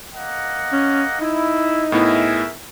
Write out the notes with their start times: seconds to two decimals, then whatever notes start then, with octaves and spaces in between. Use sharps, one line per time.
0.14 A#3 D#5 F#5
0.72 C#4
1.20 D#4 E4
1.92 A2 B3 E4 G#4 A#4 E5